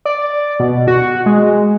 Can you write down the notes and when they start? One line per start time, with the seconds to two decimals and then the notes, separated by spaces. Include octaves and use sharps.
0.05 D5
0.60 B2
0.88 F#4
1.26 G#3